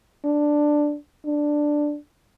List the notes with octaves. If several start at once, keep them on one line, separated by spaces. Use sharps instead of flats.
D4
D4